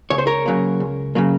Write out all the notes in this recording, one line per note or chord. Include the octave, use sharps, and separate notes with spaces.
C#2 C#5
C5
A#4 C#5
C#3 F#3 A#3
C#2
C#3 F#3 A#3